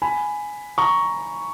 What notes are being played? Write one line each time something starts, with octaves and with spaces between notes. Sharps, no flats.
G#5 B5
A#5 C#6